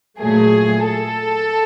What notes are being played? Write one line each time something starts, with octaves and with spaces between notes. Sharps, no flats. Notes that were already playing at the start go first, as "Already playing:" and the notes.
A#2 F#3 A3 G#4
A4